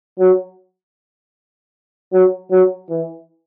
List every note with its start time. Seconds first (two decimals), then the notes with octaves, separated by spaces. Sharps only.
0.19 F#3
2.13 F#3
2.51 F#3
2.90 E3